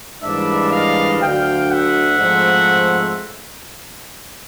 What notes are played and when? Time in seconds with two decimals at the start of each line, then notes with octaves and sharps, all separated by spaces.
0.23 G#2 E3 G3 A#3 D4 D5 E5
0.72 D#5 F5
1.21 D2 D3 F#3 F5 G5
1.70 E5 F#5
2.18 G#2 F3 A3 C4